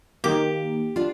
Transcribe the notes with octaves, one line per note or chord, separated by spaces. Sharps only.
D#3 A#3 G4
D4 F4